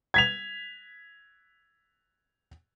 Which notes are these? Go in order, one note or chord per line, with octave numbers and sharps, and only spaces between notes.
G#6 B6 F7